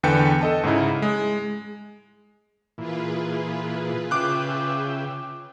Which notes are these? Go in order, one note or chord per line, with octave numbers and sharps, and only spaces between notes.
E2 D3 B4 G5 C#7
A4 D#5 A5
G#2 C#3 D#4 E4
G#3
A#2 E3 F4 G#4 B4
C#3 E5 G5 D6 F#6